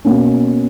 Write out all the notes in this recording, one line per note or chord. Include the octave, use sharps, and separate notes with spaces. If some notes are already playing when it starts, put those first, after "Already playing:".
B2 A#3 C#4